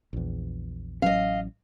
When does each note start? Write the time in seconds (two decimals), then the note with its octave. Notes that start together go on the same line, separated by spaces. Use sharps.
0.13 A#1 E2
1.02 A1 F#3 C#4 D#5 F5